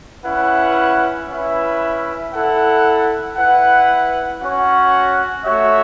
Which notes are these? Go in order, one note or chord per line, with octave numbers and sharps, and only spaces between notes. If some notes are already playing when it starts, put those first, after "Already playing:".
C#4 E4 B4 F#5
C#4 E4 B4 E5
E4 A4 F#5
E4 B4 F#5
C#4 F#4 C#5 F#5
A3 F#4 C#5 E5